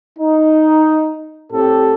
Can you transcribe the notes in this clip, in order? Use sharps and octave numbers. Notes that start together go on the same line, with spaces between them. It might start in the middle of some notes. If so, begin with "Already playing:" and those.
D#4
A2 C4 G4 A4